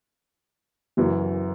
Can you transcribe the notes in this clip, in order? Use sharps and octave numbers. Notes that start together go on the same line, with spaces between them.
F#1 F#2 E3